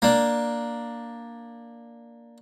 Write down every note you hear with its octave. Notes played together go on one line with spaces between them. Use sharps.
A#3 D4